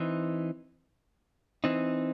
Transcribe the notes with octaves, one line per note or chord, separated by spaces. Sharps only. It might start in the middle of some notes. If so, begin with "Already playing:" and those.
Already playing: E3 C4 D#4
E3 C4 D#4